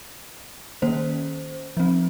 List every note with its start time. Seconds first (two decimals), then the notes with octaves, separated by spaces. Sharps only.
0.82 D#3 A#3 C#4 C5
1.77 F3 C4